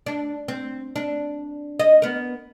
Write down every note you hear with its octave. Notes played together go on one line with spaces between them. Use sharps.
D4
C4
D4
D#5
B3 A#4